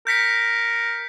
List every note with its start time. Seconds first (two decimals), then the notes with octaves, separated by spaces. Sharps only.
0.07 A#4 G6 B6 C#7